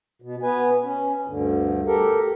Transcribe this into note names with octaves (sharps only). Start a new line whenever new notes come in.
B2
B3 B4 G#5
C#4
D2 G2 D3
G4 A4 A#4